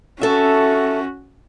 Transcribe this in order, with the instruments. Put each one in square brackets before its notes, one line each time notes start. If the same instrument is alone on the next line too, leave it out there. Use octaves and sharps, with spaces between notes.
[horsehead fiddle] C#4 F#4 [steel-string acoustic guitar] A4 E5